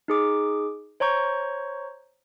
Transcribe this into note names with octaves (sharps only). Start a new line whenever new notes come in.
D#4 G#4 D6
C5 C#5 A#5 C#6 G6